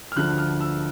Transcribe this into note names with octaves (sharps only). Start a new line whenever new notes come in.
F6
D2 D3 F3 F#6
F6
E6